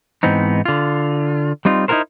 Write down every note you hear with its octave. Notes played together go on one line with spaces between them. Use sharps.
G#2 E3 B3 C4 D#4
D3 F4
G3 C4 D#4 F4
D#4 E4 F#4 A4 A#4 C5